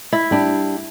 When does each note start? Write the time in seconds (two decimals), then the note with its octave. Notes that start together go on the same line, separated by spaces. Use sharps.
0.12 E4
0.31 G3 D4